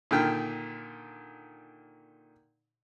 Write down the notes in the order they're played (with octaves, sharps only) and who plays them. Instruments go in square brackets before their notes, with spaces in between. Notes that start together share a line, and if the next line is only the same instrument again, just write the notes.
[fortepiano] A#2 D3 D#3 G5 F6